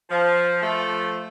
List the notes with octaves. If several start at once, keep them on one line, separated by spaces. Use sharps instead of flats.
F3
F3 A3